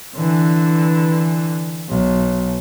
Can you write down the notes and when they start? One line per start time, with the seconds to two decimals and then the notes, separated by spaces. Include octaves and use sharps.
0.16 D3 E3
1.89 B1